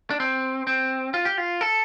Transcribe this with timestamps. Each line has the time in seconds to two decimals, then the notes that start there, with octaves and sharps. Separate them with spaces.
0.10 D4
0.20 C4
0.67 C4
1.14 F4
1.25 G4
1.38 F4
1.61 A4